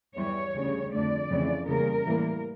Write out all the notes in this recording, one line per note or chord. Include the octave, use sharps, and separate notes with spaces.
E2 E3 G3 C#5
D2 C#3 G3
F2 D3 A3 D5
F2 C#3 E3 A3
E2 C#3 G3 A#3 A#4
A2 E3 G3 A#3